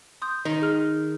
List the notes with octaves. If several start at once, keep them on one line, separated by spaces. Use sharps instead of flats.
C6 D#6 G6
D#3 D#4
G#4 F6